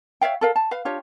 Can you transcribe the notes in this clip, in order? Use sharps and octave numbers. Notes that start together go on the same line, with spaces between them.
C#5 E5 F5 G5
A4 A#4 F5
A5
B4 F5
D4 F4 G4 C#5